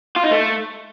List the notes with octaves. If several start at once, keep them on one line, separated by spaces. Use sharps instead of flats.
F4
D#4
A3